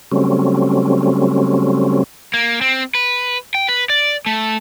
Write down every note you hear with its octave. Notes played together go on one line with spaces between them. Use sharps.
C#3 F#3 G3 A3 C4 C#4
A#3
C4
B4
G5
B4
D5
A3